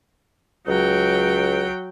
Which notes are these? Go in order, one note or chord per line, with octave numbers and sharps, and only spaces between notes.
C#2 F#3 G5